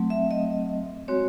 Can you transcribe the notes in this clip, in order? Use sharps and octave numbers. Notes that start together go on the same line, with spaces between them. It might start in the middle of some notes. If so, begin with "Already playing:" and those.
Already playing: F#3 A3 C4
E5
D#5
G#3 C4 F#4 C#5